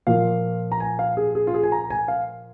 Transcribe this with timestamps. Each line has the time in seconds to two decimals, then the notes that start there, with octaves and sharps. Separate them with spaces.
0.07 A#2 F3 A#3 F5
0.72 A#5
0.80 G#5
0.99 F5
1.17 G#4
1.35 G#4
1.47 F4
1.54 G#4
1.63 G#5
1.72 A#5
1.90 G#5
2.08 F5